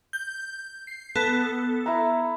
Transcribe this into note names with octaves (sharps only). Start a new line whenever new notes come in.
G6
C7
B3 A4
E4 A#5